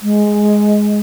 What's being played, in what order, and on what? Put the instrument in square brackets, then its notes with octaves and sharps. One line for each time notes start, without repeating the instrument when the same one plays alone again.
[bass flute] G#3